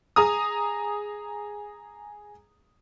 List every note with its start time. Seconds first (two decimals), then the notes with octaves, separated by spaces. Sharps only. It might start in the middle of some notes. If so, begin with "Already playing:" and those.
0.16 G#4 A#5 D#6